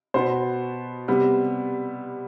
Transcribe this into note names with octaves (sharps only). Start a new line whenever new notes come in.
B2 B3 C5
C3 G3 B3